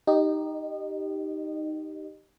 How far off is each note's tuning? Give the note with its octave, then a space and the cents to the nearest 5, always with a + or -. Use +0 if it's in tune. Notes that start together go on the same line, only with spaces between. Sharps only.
D#4 +0 G4 -5 D#5 -30